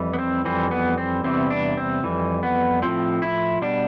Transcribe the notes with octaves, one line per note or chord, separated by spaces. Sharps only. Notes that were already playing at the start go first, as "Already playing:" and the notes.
Already playing: F2 E3 G3
B3
C4
F2 E3 G3 C4
B3
C4
E2 C3 E3 G3 C4
D4
C4
F2 E3 G3
B3
A2 F3 C4
E4
B2 G3 D4